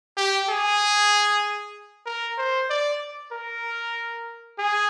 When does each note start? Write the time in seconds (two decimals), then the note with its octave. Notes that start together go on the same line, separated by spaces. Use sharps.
0.17 G4
0.49 G#4
2.06 A#4
2.38 C5
2.70 D5
3.32 A#4
4.59 G#4